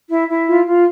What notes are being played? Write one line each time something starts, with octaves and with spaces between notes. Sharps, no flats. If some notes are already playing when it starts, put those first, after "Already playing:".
E4
E4
F4
F4